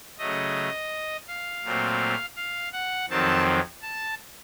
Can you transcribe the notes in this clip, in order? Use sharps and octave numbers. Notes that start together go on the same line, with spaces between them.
C#3 F#3 A3 D#5
F5
A#2 F#3 A3 C4
F5
F#5
F2 D#3 F#3 C4 A5
A5